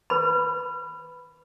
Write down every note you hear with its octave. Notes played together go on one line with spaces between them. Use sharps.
B4 B5